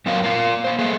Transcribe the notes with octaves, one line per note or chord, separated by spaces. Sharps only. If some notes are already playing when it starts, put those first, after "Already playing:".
F#2 F#3 C4 A#4 F5
A#3 F4
A#3 C5
A3 A#3 G#4